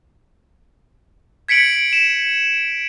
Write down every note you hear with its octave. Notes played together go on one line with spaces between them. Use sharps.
G#6 B6 C#7 D7 F#7
E7